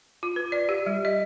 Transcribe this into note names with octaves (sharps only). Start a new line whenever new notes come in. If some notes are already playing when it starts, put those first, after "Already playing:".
F4
B4
D5
G4
G3
D#5